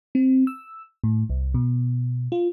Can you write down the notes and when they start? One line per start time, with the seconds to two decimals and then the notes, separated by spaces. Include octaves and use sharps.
0.15 C4
0.47 E6
1.04 A2
1.30 C2
1.54 B2
2.32 F4